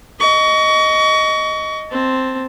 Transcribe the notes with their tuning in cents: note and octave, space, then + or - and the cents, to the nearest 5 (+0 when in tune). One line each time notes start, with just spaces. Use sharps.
D#5 +0 C#6 +30
C4 +0 A5 +0